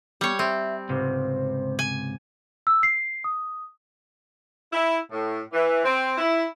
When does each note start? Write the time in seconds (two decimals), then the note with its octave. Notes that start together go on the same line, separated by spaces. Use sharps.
0.21 G3 B3 C#5
0.39 C4 E5
0.89 C#2 G#2 C3 C5
1.79 G#5
2.67 E6
2.83 C7
3.24 D#6
4.73 E4
5.11 A2
5.52 E3
5.85 C4
6.18 E4